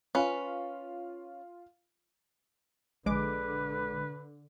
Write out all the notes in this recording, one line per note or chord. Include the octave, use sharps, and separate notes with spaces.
C#4 F4 B4 F5
A#1 D3 G#3 B4 D6